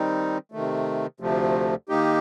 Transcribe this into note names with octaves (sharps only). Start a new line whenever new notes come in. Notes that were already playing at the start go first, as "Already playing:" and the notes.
Already playing: D#3 G3 C4 D#4
C3 D#3 A3
D2 C3 F3 A3
D#3 A#3 D#4 G4